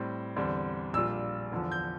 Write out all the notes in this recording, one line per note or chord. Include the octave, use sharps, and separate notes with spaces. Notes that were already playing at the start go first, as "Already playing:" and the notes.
Already playing: A2 G3 C4
E2 D3 G3 C4
A#1 A#2 G3 D4 F4 E6
E2 D3 F3
G6